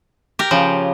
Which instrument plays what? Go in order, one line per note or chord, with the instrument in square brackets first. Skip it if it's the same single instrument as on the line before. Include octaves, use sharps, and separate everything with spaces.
[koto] G4 A#4
[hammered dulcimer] C#3 [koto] F3